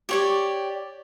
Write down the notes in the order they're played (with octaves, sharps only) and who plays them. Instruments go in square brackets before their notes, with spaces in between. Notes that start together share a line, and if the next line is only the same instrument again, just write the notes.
[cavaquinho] G4 C#5 D5